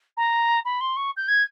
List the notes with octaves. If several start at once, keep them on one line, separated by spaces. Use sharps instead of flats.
A#5
B5
C6
C#6
G6
G#6